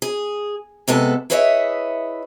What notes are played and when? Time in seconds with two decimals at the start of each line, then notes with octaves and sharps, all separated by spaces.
0.02 G#4
0.88 C3 G#3 B3 A4
1.30 E4 G#4 B4 C#5 D#5 E5